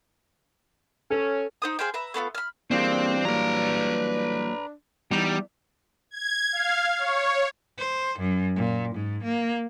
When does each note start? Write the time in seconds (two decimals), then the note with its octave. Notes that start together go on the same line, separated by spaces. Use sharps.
1.10 C#4 A4
1.62 D#4 C5 D#6
1.79 G#4 C5 F5 G5
1.94 B4 E5 A#5
2.14 A3 B3 E4 F4
2.35 B5 F6
2.71 E3 G3 A#3 C4 D4 F4 G#4 A#4
3.25 F#3 A#3 B4 A#5
5.11 E2 E3 G3 B3 D#4 A#5
6.11 G#6
6.53 F5
6.98 C#5
7.78 C5
8.19 F#2
8.56 A#2
8.95 G#2
9.24 A#3